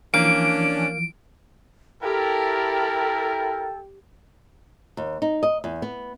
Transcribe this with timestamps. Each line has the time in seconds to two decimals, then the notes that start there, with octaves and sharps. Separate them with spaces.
0.14 E3 F3 A#3 C#4 D4 D7
2.03 E4 G4 A4 A#4 G5
4.97 D#2
5.22 D#4
5.43 D#5
5.64 E2
5.82 B3